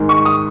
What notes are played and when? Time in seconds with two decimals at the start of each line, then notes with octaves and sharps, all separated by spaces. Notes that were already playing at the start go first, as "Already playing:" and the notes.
Already playing: G#2 D#3 G#3
0.09 C#6
0.25 D#6